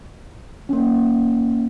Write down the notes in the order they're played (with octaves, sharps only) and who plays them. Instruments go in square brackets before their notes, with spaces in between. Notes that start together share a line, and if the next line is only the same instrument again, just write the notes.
[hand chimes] A#3 C#4